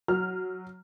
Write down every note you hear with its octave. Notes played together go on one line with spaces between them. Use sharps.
F#3 F6